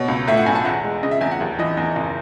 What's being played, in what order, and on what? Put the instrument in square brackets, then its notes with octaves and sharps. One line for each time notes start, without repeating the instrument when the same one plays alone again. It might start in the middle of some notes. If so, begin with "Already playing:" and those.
Already playing: [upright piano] B2 C#5
C#2
A2 E5
F#5
B1 G#5
A5
E2 F#5
G#3
C#3 D#5
E5
E2 G#5
F#5
D#2
E3 D#5
E2 D#5
F#1